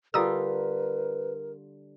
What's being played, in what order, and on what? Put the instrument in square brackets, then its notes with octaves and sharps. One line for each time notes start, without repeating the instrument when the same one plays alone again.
[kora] D3 G3 F4 [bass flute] A#4 [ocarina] B4 [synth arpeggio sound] A#5 D#6 E6